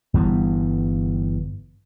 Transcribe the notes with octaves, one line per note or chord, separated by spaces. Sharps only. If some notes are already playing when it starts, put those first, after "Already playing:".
G1 G2 E3 B3